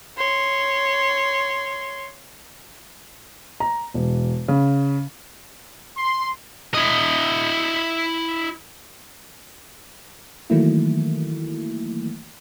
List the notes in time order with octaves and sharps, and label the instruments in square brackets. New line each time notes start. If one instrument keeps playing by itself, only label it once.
[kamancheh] C#5 C6
[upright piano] A#5
E1
C#3
[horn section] C6
[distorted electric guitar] E4 D#5
[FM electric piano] D#3 E3 F#3 A3 A#3 E4